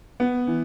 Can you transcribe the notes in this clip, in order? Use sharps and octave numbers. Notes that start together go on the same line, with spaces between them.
B3
E3